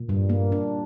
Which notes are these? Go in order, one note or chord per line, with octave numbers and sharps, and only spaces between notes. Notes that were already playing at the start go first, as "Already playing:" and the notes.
Already playing: A#2
G2 G3
A#3
D4